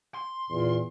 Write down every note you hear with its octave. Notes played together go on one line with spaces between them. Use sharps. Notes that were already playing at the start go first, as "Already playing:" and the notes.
C6
E2 A#2